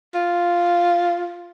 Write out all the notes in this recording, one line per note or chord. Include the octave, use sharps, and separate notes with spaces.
F4